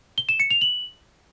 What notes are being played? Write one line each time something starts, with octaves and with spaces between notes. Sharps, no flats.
G7
E7
C#7
F7
F#7